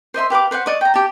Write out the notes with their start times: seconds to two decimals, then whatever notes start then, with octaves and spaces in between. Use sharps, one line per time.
0.14 C5 D#5 E5 C6
0.30 G4 B4 F5 D6
0.51 B4 C5 D#5 F#5
0.66 D5 D#5 C#6
0.81 G5 A#5
0.94 G4 A5